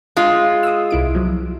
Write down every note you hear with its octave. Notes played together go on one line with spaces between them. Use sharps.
G#3 F4
D#6 E6
C2 E4 D7
F3 F#3